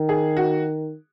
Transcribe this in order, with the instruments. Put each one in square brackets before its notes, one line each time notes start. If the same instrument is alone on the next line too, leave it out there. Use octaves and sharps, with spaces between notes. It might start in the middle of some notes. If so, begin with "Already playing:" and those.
Already playing: [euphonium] D#3
[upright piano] G#4
F#4